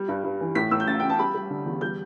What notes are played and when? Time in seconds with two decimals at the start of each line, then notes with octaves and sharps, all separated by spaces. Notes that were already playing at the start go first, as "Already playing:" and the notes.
Already playing: G3
0.08 G2
0.24 G2
0.40 E3
0.55 A2 B6
0.71 A2 E6
0.80 G6
0.87 A1 A6
1.00 A1 G5
1.10 A5
1.19 G3 B5
1.34 G3
1.50 D3
1.66 E2
1.81 G3 G6